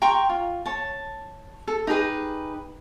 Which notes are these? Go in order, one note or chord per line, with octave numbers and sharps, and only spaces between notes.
G5 A#5 C6 C#6
F4
C#5 A5
A4
D#4 G4 G#4 B4